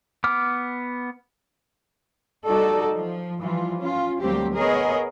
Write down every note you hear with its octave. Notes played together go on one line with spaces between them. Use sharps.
B3 D6 F6
G3 D#4 F#4 A4 D5
F3
E3 F3 G3 F4
C#4 F4
D2 F#3 G3 A#3 C4 G4
B3 G#4 A#4 C#5 D#5